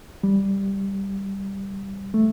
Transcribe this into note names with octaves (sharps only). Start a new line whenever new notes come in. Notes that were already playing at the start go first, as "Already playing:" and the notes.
G3
A3